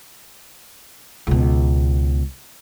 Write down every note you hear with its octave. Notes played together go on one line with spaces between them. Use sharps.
C#2 B2